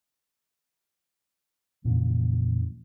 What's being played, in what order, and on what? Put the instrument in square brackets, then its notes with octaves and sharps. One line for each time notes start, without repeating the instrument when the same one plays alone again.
[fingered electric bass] F2 A#2 C#3 E3